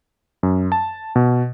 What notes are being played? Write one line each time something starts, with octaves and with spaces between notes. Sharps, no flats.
F#2
A5
B2